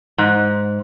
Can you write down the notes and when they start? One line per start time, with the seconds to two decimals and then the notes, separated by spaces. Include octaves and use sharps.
0.18 G#2